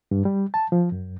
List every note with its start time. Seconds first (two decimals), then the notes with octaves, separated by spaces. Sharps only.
0.11 G2
0.25 G3
0.54 A5
0.72 F3
0.92 F#2